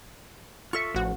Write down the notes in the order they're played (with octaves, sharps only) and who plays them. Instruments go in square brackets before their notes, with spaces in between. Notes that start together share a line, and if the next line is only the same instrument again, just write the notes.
[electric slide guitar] F4 A4 E5 [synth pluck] C#6
[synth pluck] A1 F#4 [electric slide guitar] F3